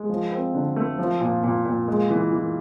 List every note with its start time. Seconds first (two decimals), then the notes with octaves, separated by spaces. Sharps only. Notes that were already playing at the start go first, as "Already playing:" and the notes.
Already playing: G#3
0.09 F3
0.32 C4
0.54 D3
0.76 A3
0.98 F3
1.21 A#2
1.43 A#2
1.65 A#2
1.88 G#3
2.10 E3
2.33 E3